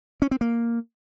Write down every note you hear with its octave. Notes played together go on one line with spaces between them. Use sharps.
C#4
C4
A#3